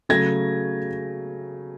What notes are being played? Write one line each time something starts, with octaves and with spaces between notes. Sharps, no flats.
C#3 F#3 A3 G#6 A#6